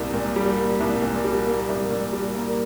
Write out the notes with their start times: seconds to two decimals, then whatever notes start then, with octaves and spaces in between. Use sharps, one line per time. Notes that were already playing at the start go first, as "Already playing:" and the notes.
Already playing: C2 A#2 G3 A#3
0.14 A#2
0.36 G3
0.58 A#3
0.80 C2
1.02 A#2
1.24 G3
1.47 A#3
1.68 C2
1.91 A#2
2.13 G3
2.35 A#3